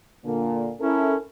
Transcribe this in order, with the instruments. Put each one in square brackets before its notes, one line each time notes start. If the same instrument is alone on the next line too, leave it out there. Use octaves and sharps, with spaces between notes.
[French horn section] A#2 D3 A#3
[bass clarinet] C#4 [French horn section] E4 A4 A#4